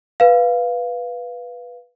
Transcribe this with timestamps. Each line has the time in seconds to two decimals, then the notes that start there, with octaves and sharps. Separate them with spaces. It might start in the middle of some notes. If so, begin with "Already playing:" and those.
0.20 B4 F5